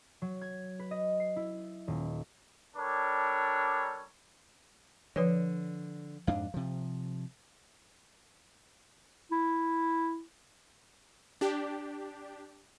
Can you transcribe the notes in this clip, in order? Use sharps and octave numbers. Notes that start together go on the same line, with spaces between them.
F#3
G#6
B4
D#5
C7
E4
D#1
G3 D4 A4 A#4 C#5
D3 F3 B4 C#5
F2 G#2 D4 F5
C3 F3
E4
D4 G4